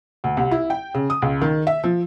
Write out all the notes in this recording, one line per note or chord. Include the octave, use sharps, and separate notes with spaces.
D2
C2
E4
G5
C#3
D#6
C#2
D#3
E5
F3